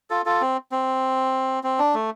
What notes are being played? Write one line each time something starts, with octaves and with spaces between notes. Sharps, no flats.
F4 A4
F4 A4
C4
C4
C4
D4
A3